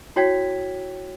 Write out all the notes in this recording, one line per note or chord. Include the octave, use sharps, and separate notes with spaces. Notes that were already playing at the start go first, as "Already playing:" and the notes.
E4 F#4 C#5 G5 G#6 B6